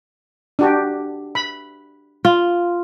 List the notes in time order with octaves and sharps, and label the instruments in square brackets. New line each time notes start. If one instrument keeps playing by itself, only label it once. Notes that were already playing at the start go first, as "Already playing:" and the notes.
[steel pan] D4 F#4 G4
B5
[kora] F4